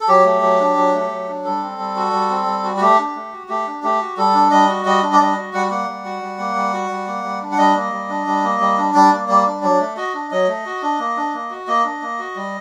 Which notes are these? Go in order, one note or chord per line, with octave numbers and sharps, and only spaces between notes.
A4
F#3 G4
A3
F#3
D4
F#3
A3
F#3
D4
G3 A4
C4
G3
F#4
G3
C4
G3
F#4
F#4
A3 G4
D4
A3
F#4
A3 G4
D4
A3 G4
F#4
G3 A4
D4
G3 D#5
F#4
G3 D#5
D4
D5
G3 D#5
F#4
G3 F#5
A#3 F#5
G3
F#4
G3
A#3
G3
F#4
G3
A#3
G3
D4
F#5
G3 D#5
A#3
G3
D4
G3
A#3
G3
D4
G3 D5
A#3
G3 D5
D4
F#3 D5
A3
F#4 D#5
D4
F#3 D#5
A3
F#4
D4
A#3
D4
A#3
F#4
A#3 D#5
D4
A#3
F#4
G3